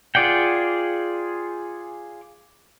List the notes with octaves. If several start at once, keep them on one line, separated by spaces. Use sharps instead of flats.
F4 G#4 D5 F#5 G5